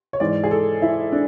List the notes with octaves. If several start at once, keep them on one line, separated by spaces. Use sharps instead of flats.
C#5
G#2 E3 D5
G#4
A4
E4
D4